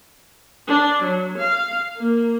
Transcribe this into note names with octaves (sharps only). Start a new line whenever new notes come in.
D4
F#3
F5
A#3